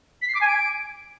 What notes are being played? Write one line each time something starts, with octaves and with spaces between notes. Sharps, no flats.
B6
C7
D6
G#5
D7